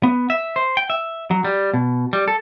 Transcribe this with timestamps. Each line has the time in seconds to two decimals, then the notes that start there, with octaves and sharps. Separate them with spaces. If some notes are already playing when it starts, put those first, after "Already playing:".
0.03 B3
0.30 E5
0.56 C5
0.77 G5
0.90 E5
1.31 F#3
1.44 G3
1.74 B2
2.13 G3
2.28 A4